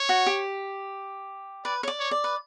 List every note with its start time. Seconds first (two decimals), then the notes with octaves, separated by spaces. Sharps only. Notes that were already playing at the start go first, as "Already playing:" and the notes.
Already playing: C#5
0.09 F#4
0.26 G4
1.65 B4 D5
1.83 C#5
1.88 D5
1.99 C#5
2.11 D5
2.24 B4